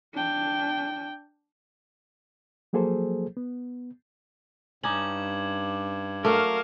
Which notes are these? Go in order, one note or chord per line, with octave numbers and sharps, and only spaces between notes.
D4 G5
F3 F#3 A#3 G#4 A4 C5
B3
G2 C#4 D#4 D6 G#6 F#7
F#3 A3 A#4 F5 C#6 D6